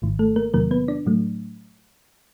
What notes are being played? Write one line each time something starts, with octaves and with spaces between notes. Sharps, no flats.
G#1 G#2 D#3
A3 A4
A#3 A#4
E2 C3 D#3 F#3 A#3 A#4
B3 B4
D4 D5
A2 F#3 A3